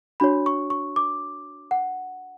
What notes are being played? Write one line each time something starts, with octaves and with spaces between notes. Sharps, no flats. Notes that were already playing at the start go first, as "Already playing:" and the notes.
D4 F#4 C#5 B5
C#6
C#6
D6
F#5